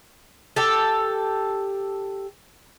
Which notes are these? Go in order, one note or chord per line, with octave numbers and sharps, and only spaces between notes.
G4 A4